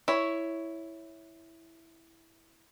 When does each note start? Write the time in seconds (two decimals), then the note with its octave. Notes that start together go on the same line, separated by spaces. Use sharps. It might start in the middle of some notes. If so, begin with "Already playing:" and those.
0.08 E4 C#5